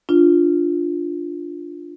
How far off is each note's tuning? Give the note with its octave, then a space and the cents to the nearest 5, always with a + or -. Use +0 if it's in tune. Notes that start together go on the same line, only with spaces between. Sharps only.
D4 +0 F4 +0